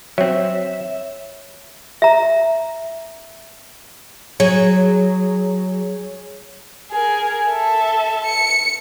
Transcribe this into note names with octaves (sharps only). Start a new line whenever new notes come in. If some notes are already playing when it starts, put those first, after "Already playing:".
F#3 C4 C#5 E5
E5 A#5
F#3 G#4 C#5
G#4 A#4
A4 E5
C#7